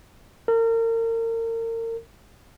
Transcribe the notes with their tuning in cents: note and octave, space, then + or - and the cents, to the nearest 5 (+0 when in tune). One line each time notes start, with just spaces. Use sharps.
A#4 -35